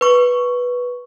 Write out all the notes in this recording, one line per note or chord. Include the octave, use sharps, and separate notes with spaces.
B4 C#6